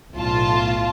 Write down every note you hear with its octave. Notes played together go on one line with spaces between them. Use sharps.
B1 A2 F4 A5